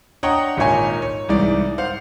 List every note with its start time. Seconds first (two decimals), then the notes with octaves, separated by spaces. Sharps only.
0.23 D4 C#5 D#5 F#5 G5 A#5
0.57 G#1 A#2 D#4 C#5 G#5
1.02 C#5
1.29 C2 G#2 E3 D5
1.78 C5 F5 F#5